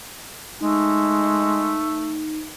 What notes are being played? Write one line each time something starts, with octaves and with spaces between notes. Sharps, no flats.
G#3 A3 D#4